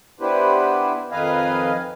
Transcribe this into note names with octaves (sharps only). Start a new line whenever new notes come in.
B3 D4 E4 G4 B4 C5
F2 D#3 B4 D#5 F5 G#5